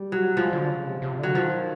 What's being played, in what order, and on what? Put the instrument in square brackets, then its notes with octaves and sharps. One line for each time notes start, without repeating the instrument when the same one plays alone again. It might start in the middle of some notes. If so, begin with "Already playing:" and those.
Already playing: [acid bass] G3
[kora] F#3
[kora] F3 [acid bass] G#3
[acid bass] D3
C#3
C3
C3
[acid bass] D3 [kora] F#3
[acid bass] D#3 [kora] F3